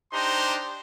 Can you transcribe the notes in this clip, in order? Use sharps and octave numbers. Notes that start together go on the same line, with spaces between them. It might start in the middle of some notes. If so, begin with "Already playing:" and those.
D4 D#4 G4 C5 A#5 C6